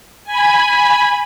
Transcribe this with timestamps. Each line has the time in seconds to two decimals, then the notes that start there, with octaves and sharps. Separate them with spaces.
0.24 G#5 B5